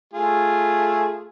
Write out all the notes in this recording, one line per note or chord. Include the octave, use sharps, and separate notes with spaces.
A3 F4 G#4